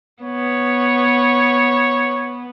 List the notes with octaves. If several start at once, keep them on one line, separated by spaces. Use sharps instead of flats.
B3 C#5